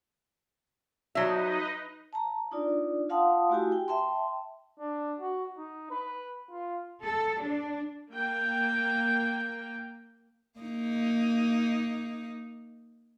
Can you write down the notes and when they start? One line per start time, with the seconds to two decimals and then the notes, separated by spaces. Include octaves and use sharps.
1.15 F#3 D#4 B4 D#5 E5
2.13 A5 A#5
2.51 D4 D#4 F4 D5
3.09 F4 F5 F#5 A5 C6 D#6
3.50 A3 E4 F#4 G4 G#5
3.72 G5
3.88 E5 G5 A5 C6
4.79 D4
5.20 F#4
5.57 D#4
5.90 B4
6.51 F4
7.04 A4
7.43 D4
8.13 A#3 G5
10.60 A#3 D#4